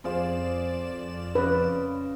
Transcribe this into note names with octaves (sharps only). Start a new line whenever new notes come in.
F2 F4 G#4 C5 D5 E7
C#3 B4 D#5